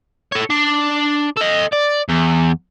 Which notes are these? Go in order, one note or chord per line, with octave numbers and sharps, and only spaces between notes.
A4 C#5
D4
A4 D#5
D5
E2